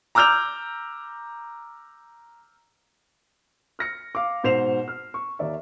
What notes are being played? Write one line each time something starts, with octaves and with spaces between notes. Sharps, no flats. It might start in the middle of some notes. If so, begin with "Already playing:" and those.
A#5 D6 E6 F6 G6 F7
F6 A#6 C#7
F5 D6
G#2 B2 C5 C7 E7 F7
F6
C#6
D#2 A#4 D5 E5